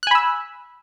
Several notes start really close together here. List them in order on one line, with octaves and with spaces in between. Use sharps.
F#6 G#5 B5 E6